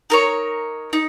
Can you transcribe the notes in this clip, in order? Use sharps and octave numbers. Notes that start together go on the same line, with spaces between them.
D#4 A#4 C#5
D#4